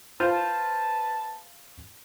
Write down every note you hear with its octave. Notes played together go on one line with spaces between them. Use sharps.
F4 B4 C5 A5